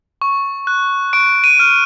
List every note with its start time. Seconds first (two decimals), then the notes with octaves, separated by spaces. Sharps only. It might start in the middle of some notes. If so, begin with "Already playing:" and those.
0.22 C#6
0.67 F#6
1.13 C#6 D7
1.44 D#7
1.59 F6